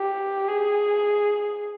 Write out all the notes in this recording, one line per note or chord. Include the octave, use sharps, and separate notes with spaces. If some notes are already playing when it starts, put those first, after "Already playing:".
Already playing: G4
G#4